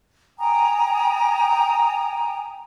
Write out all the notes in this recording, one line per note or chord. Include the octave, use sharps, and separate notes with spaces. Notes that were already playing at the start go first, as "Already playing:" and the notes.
G5 G#5 A#5 D#6